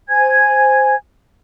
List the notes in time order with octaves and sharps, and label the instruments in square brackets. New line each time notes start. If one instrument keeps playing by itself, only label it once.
[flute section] C5 G#5 G#6